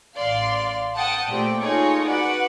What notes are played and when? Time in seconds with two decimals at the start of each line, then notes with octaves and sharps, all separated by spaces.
0.18 A1 D5 F5 C6
0.95 F#5 G5 A5 D#6
1.28 A#2 A3 C4 G4 D5 G5
1.62 D#4 F4 G#4 A4 C#5 D#5
2.06 F#4 B4 D5 F#5